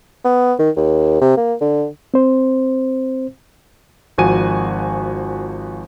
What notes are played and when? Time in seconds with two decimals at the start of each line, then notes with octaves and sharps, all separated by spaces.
0.25 B3
0.59 D#3
0.77 D#2
1.21 C3
1.37 A#3
1.61 D3
2.14 C4 C5
4.18 G#1 F3 F#4 G#5 D#7